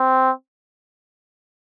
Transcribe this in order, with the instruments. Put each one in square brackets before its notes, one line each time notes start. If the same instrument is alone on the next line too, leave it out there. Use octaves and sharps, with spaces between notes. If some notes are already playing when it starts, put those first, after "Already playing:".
Already playing: [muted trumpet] C4